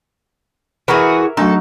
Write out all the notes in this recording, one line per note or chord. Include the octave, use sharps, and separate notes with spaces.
E3 F#4 G#4 A#4 E5
F#3 A3 D4 D#4 F#4 A4